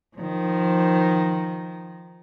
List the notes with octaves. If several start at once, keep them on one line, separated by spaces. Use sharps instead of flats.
D#3 F3